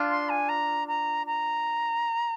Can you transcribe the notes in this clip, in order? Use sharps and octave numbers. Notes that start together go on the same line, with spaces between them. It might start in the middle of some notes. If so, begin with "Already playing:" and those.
Already playing: D4 F4
C6
G#5
A#5
A#5
A#5